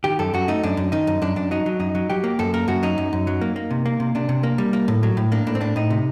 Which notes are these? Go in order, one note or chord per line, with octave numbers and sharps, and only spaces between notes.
D#3 G4
F#2 A4
F#2 F#4
A3 D#4
F#2 D4
F#2
D#3 D#4
F#2
F#2 D4
F#2 D4
F#3 D#4
F#3
F#2 D#4
F#3
F#3 G4
A#3
F#2 A4
A#3 A#4
F#2 F#4
F#3 D#4
F#2
F#2
F#3
A#3
A#3
C3
A#3
C3
C3 D4
C3
A#3
G3
A#3
A2
F#3
A2
A#3 D4
A2 D4
C4
A2 D4
A2 D#4
C3